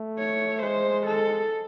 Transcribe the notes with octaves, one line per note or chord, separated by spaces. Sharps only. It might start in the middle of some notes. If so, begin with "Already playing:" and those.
Already playing: A3
C#5
G#3 C5
A4